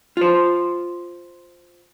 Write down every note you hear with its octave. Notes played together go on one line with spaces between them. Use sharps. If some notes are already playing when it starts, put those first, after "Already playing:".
F4 C5